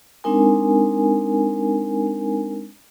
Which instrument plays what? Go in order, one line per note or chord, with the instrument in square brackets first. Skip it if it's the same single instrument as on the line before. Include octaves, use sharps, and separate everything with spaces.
[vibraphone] G#3 C4 D4 D#4 A#4 G#5